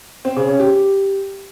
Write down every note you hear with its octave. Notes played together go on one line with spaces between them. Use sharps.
C4
C#3
C#4
G4